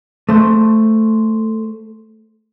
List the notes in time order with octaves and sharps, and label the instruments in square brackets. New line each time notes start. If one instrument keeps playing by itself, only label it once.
[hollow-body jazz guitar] A3 C5